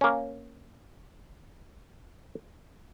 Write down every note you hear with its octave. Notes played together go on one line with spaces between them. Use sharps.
A#3 C#4